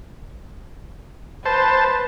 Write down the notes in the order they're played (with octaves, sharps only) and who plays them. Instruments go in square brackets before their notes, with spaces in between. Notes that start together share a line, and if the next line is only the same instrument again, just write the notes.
[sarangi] B4 [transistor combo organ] C5 A5